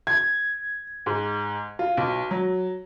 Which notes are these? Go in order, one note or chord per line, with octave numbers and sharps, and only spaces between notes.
G#6
G#2
F4
B1
F#3